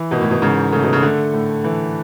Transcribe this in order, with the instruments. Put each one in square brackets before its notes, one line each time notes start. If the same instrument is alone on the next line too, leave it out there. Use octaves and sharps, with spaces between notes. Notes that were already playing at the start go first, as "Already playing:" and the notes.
Already playing: [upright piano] E3
[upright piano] G#1 [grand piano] B2
[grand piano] A2
B2
[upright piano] G#2 [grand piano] C#3
[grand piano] C#3 [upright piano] A3
[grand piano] B2
C#3
[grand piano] D3 [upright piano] A3
[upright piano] A2
E3